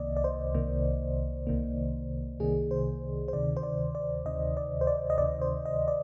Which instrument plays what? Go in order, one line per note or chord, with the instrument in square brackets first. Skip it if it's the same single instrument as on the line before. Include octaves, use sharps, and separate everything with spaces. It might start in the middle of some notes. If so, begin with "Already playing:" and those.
Already playing: [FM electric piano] C2 C3 D#3 A#3 D5 D#5
D5
C5
C2 C3 D#3 A#3
C2 C3 D#3 A#3
C2 C3 D#3 A#3 G#4
C5
C5
D2 C3 D#3 D5
C5
D5
D5
D2 C3 D#3 D#5
D5
C5
D5
D#5
D2 C3 D#3 D5
C5
D#5
D5